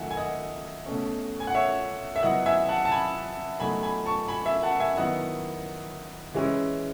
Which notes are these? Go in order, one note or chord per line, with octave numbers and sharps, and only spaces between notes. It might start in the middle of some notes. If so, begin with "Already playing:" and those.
Already playing: D#3 F#3 A3 D#4 E5 F#5 G#5
G#5
D#5 F#5
B2 A3 C#4
G#5
F#5
C#5 E5
E5
F#3 B3 E4 D#5 F#5
E5 G#5
F#5 A5
A5
G#5 B5
B2 F#3 A3 D#4 G#5 B5
G#5 B5
A5 C#6
G#5 B5
E5 G#5
F#5 A5
E5 G#5
D#3 F#3 B3 E4 D#5 F#5
E3 G#3 C#4 E4